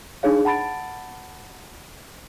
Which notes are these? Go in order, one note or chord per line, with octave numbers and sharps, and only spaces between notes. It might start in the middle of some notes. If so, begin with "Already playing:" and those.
D4 D#4 G#4 C#5 F5
F#5 A5 B5 A6 D7